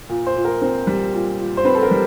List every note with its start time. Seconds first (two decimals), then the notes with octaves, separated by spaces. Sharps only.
0.09 A#2
0.26 C5
0.36 A#2
0.45 A#4
0.62 C4
0.87 G3
1.14 A#2
1.39 A#2
1.57 C5
1.65 C4 B4
1.75 A4
1.83 A#4
1.91 G3